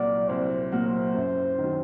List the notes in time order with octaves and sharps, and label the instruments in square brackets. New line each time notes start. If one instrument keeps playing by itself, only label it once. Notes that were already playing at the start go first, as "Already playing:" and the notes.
Already playing: [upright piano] C2 A#2 F#3 A#3 F#4 [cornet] D5
[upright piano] C2 [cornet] C5
[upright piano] A#2 F#3 A#3 F#4
[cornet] C5
[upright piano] F#2
D#3 F#3